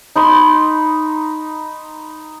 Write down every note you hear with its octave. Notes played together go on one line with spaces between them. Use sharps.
D#4 B5 C6